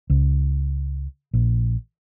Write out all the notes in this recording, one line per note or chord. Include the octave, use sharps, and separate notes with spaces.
C#2
A#1